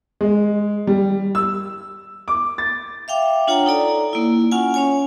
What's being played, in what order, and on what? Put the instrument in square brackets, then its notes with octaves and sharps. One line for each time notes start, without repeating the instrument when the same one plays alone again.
[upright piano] G#3
G3
E6
D6
A6
[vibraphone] E5 F5 G5 D6
D4 F4 C#5 F#5 G5 A#5
D#4 A4 D5 A#5
A#3 E4
C#4 F4 F#5 G#5
C#4 C#5 G#5